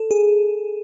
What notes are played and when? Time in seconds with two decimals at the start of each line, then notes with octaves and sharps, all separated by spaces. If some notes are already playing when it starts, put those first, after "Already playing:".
Already playing: A4
0.11 G#4